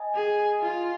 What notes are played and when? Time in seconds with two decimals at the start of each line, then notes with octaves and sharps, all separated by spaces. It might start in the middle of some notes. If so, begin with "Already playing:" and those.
Already playing: D#5 G#5
0.15 G#4
0.61 F4